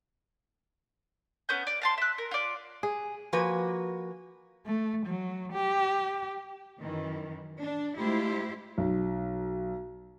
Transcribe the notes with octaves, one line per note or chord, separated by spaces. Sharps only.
B3 C#4 G6
D5
F5 A5 C6
E5 F#6
A#4
F4 D5
G#4
F3 A#3 F#4 B4 G#5
A3
F#3
G4
F#2 D#3 E3
D4
G#3 A3 E4 F4 G4 C5
B1